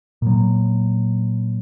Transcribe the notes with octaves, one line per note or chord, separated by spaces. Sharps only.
A#2 F#3